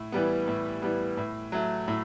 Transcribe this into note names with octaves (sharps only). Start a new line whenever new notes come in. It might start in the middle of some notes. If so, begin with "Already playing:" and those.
Already playing: A2
E3 G3 B3
A2
E3 G3 B3
A2
F#3 A3
A2